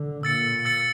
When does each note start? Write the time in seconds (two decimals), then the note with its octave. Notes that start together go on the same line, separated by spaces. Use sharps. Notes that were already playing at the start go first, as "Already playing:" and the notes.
Already playing: D3
0.23 A#2 E6 A6 C#7
0.65 E6 A6 C#7